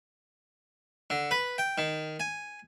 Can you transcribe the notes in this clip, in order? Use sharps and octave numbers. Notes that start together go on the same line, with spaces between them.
D3
B4
G5
D#3
G#5